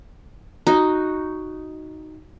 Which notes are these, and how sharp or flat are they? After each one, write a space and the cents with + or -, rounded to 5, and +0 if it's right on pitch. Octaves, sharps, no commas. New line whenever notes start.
D#4 +0 F#4 +0